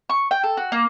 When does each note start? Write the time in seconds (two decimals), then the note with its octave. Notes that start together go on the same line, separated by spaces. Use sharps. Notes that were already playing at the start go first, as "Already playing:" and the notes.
0.09 C#6
0.31 G5
0.43 A4
0.57 F#4
0.72 A#3